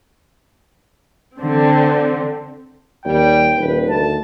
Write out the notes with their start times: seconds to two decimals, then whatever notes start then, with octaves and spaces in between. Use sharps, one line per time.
1.39 D3 C4
3.05 D#2 G3 G5
3.58 D#1 B4
3.89 D2 D#3 A5